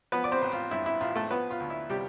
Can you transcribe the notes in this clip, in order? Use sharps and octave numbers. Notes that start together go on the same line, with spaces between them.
F3 B3 B4
D5
C4 C5
A1
F4
G2 E4
E4
A1 F4
A3 A4
F3 B3 B4
F4
D2
E4
C3 G3 G4